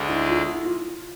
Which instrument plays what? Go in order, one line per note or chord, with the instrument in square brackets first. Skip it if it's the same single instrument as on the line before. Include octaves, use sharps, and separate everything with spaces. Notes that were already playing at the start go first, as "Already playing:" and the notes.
Already playing: [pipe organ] D2 D3 G#3 D4
[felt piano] E4
F4
E4
F4